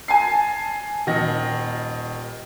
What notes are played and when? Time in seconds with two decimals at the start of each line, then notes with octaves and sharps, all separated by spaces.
0.08 G#5 A5 C7
1.07 D#1 D#3 A#6